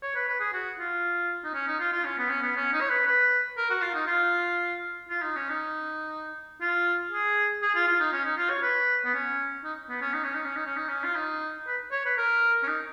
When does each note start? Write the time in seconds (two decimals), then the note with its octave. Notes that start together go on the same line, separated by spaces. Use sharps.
0.02 C#5
0.15 B4
0.28 B4
0.40 G#4
0.53 F#4
0.79 F4
1.44 D#4
1.54 C#4
1.67 D#4
1.80 F4
1.92 F4
2.05 C#4
2.18 B3
2.30 C#4
2.42 B3
2.56 C#4
2.73 D#4
2.81 C#5
2.89 B4
3.06 B4
3.57 A#4
3.70 F#4
3.82 F4
3.94 D#4
4.07 F4
5.09 F4
5.22 D#4
5.36 C#4
5.49 D#4
6.61 F4
7.11 G#4
7.62 G#4
7.75 F4
7.88 F4
8.00 D#4
8.13 C#4
8.25 D#4
8.37 F4
8.50 C#5
8.62 B4
9.05 B3
9.14 C#4
9.64 D#4
9.89 B3
10.01 C#4
10.13 D#4
10.24 C#4
10.34 D#4
10.45 C#4
10.56 D#4
10.66 C#4
10.76 D#4
10.88 C#4
11.04 F4
11.16 D#4
11.67 B4
11.91 C#5
12.05 B4
12.17 A#4
12.63 C#4
12.67 D#4